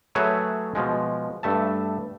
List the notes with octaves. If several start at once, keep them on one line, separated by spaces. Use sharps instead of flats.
F#3 A3 G#4 B4 C#5 E5
B2 F3 G#3
G2 A3 E5 A5